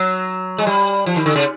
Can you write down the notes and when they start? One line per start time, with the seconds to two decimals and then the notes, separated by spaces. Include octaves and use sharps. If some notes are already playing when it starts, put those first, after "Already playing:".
Already playing: F#3
0.58 G#3
0.67 G3
1.06 F3
1.16 D#3
1.26 D3
1.36 C#3